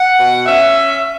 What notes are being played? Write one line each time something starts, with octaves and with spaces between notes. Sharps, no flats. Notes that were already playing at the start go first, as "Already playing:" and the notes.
Already playing: F#5
B2
C#4 E5